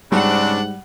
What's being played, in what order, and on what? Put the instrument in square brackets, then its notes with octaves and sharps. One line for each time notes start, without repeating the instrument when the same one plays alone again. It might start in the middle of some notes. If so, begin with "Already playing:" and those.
[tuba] G#2 [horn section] C#3 C4 D4 [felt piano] G3 [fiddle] F#5